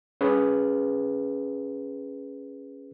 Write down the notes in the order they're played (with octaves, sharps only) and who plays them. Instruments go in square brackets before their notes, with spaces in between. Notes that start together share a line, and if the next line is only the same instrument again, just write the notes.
[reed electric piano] C#4 G#4 B4